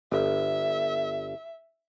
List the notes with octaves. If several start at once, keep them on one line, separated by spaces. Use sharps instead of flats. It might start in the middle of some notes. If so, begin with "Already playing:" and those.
G1 E5